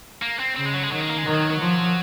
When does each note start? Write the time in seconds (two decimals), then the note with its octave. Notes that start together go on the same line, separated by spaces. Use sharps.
0.22 A#3
0.40 C4
0.56 C#3 C4
0.65 G#3
0.74 F#3
0.83 G#3
0.91 D#3 F#3
1.01 G#3
1.09 A#3
1.18 G#3
1.26 D#3 F#3
1.60 F3